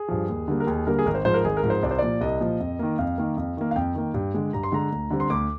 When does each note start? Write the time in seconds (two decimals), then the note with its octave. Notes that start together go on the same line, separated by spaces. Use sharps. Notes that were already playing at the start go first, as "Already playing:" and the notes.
Already playing: G#4
0.08 G2 F3
0.29 D#2
0.48 D3 G3 A#3
0.60 A#4
0.67 D#2 G#4
0.87 D3 G3 A#3 A#4
0.99 G#4
1.06 G#1 A#4
1.15 C5
1.25 G#2 F3 C5
1.34 A#4
1.44 G#1 G#4
1.57 A#4
1.63 G#2 F3
1.70 C5
1.83 C2 D5
1.91 C5
1.99 A#2 F3 D5
2.21 C2 D#5
2.40 A#2 F3
2.60 F2
2.79 D#3 A#3
2.99 F2 F5
3.18 D#3 A#3
3.37 F2
3.57 D#3 A#3
3.71 F5
3.76 F2 G5
3.95 D#3 A#3
4.14 G2
4.34 D3 G#3
4.53 G2 A#5
4.63 C6
4.72 D3 G#3 A#5
4.92 D2
5.11 D3 G3 C4
5.20 C6
5.30 D2 D6